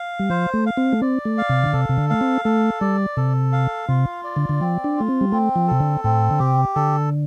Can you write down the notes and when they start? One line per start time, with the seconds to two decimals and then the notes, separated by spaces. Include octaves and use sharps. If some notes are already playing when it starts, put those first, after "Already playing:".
Already playing: F5
0.19 G3
0.30 F3 C5
0.54 A3
0.66 F5
0.77 C4
0.93 A3
1.02 C4 D5
1.25 A3
1.38 F5
1.49 C3
1.63 D3
1.73 C3 A4
1.89 C3
1.97 D3
2.10 A3 F5
2.21 C4
2.45 A3 A4
2.81 G3 D5
3.17 C3 A4
3.52 F5
3.88 C3 F4
4.24 D5
4.36 D3
4.49 D3
4.60 F3 C4
4.84 D4
4.97 A3 F4
5.08 C4
5.21 G3
5.32 A3 C4
5.56 F3
5.68 C3 A4
5.80 D3
6.04 A2 C4
6.31 D3
6.39 C3 G4
6.75 D3 A4